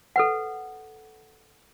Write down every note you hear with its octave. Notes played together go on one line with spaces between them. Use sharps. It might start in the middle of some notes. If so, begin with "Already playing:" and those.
A4 B4 F#5